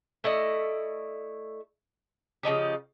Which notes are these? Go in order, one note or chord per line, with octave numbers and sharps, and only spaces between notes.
A3 E4 D5 D#5
C#3 F3 D#4 G4